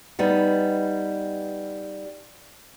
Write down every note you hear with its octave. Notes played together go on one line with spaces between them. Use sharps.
G3 B3 D#4